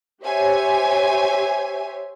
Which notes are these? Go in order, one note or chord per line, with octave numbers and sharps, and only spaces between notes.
G4 C5 C#5 E5 G#5